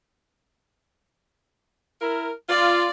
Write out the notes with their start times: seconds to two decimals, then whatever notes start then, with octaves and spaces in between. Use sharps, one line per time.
2.00 E4 A#4
2.49 F4 D5